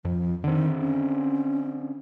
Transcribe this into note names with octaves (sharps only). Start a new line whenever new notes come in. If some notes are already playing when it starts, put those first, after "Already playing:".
F2 F3
D3 D#3 C4
C#4